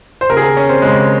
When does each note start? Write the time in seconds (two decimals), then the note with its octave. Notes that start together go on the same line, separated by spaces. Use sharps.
0.21 C5
0.29 D#2 C#3 A#4
0.37 G#4
0.42 A#4
0.57 C#4
0.69 C4
0.82 D#2 C#3 G#3